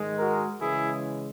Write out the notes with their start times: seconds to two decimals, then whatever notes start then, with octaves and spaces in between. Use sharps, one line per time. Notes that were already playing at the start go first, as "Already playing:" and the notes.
Already playing: G#2 D#3 G#3
0.18 F#4 A#4
0.61 C#3 E3 G#3 E4 G#4